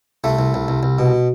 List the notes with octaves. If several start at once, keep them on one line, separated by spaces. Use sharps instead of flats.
C2 A3
C2
C2
C2
C2
B2